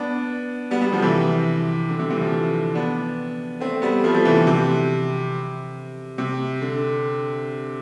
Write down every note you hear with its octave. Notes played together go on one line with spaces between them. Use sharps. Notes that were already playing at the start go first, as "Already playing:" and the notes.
Already playing: B3 D4
G3 B3
G3 B3
D3 F3
C3 E3
D3
C3
C3 E3
D3 F3
B3 D4
A3 C4
G3 B3
F3 A3
F3 A3
C3 E3
D3
C3
C3
D3